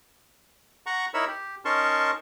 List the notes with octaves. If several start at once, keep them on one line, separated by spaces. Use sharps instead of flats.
F#5 A#5 C#6
D#4 E4 A#4 C#5 B5 E6
G4
C#4 D#4 A#4 A5 C6 C#6